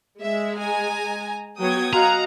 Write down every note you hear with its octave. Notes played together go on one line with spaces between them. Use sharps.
G#3 G#4 E5
G#5 A#5
F#3 B3 C#5 G5 D#6 G#6
F#4 D#5 F5 F#5 A#5